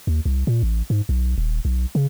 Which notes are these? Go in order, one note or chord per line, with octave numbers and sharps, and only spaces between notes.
D#2
C2
A#2
A1
G#2
B1
D#1
B1
C#3